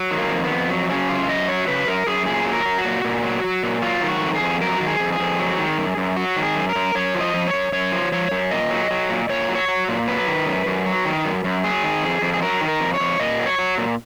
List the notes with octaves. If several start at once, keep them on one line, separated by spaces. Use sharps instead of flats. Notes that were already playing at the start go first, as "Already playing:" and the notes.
Already playing: F#3
D#3
A#3
F2
B3
F2
F#3
C#3 C#4
F#2 F4
F#2 D#5
F#3 C#5
C#3 B4
F#2 A#4
F#2 G#4
A#2 G#4
F#3
A#4
F#3
F#4
A#2
A#2
F#3
F#3
A#2
F#3 F4
D#3
F#4
F2
G#4
F2
F#3 A#4
D#3 F#4
G#4
F2
G#4
F2
F#3
D#3
F#2
F#2
F#3 F#4
D#3
G#4
F#2
A#4
F#2
F#2 C#5
F3
D#5
F3
C#5
F#2
F#2 C#5
F3
F3 C#5
F#2
A#2 D#5
F#3
F#3
A#2
A#2 C#5
F#3
C#5
F#3
A#2
F#3 B4
D#3
F#2
F#2
F#3
D#3
F#2
F#2
F#3 G#4
D#3
F2
F2
G#4
F#3 A#4
D#3
A#4
F2
C#5
F2
A#2 D#5
F#3
C#5
F#3
A#2